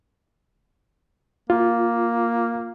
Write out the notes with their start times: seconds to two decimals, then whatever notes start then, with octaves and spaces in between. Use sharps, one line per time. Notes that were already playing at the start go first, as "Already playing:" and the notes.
1.50 A#3 F4